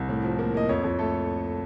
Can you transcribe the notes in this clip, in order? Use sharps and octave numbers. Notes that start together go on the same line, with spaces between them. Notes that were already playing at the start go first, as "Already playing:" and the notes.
Already playing: C2
A2
F3
A#3
A#3 D#5
F2 C#5
F2
A3 A4